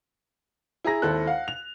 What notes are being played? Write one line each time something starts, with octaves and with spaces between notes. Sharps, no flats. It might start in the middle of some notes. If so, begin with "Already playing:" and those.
E4 G#4 A#5 A#6
G#1 D#2 E4 A4 C5 F#6
F5 F#5
F7